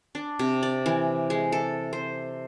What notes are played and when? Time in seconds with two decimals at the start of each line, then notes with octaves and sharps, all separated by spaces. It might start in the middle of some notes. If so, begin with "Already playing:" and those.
0.15 D4
0.39 C3
0.63 D5
0.86 E3
1.30 G#3
1.52 A4
1.93 C5